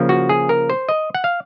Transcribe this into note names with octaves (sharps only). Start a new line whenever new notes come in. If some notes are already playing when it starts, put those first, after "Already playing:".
Already playing: C#3 F3 A#3
F#4
G#4
A#4
C5
D#5
F#5
F5